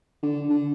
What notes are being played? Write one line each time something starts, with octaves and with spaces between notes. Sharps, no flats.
D3
D3